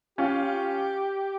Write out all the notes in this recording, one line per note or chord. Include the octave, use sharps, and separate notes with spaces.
C#4 F4 G4